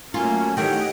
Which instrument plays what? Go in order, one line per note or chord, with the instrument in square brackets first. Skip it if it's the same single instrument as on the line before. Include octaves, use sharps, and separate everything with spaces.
[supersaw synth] F#3 A3 [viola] A#3 [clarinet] C#4 [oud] F4
[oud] D#3 E3 A3 [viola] G4 C#5 [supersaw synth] D#5 F#5 [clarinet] G5